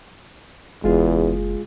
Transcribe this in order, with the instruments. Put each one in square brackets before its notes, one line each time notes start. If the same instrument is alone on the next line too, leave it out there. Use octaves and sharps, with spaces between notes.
[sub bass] F#1 [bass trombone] E2 [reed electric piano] G#3 F4 G#4